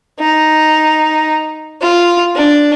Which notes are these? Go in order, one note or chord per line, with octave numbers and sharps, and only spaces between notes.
D#4
F4
D4